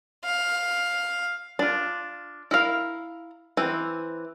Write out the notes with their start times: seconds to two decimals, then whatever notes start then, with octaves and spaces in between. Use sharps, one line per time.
0.25 F5
1.59 D4 F4
2.51 E4 A#4 F5
3.57 E3 C4